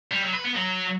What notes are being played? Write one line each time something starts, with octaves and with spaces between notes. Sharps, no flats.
G3
F#3
B4
B3
F#3